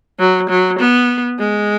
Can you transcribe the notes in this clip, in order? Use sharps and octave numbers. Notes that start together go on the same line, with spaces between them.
F#3
F#3
B3
G#3